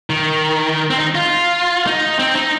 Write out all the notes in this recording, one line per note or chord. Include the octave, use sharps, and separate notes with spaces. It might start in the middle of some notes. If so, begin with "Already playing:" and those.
D#3
C4
D#4
F4
D#4
C4
D#4